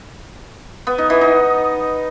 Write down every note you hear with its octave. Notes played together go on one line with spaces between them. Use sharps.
B3
D#4
E3
D#4